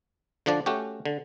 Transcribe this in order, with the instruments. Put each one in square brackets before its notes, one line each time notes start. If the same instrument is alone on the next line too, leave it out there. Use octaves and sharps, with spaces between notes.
[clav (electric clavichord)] D3 F3 D4 D5
A3 C#4 F#4 G4
D3